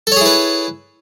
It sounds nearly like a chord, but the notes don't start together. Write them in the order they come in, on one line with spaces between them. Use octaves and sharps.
A4 C#5 G#4 E4 B4